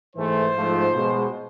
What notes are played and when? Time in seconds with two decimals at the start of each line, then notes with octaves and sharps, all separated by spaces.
0.15 G#2 E3 A3 C5
0.55 G#2 F3 A3
0.94 B2 G#3